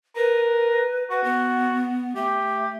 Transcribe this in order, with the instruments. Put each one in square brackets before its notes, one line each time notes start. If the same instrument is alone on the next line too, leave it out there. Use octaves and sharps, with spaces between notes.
[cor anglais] A#4 [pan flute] B4
[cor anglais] F#4 [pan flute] B4
[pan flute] B3
[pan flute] A3 [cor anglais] G4